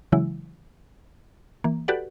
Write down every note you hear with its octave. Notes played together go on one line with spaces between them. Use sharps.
C#3 E3 F#3 G#3 E4
E3 A#3
F#4 G4 A4 B4 D5 F#5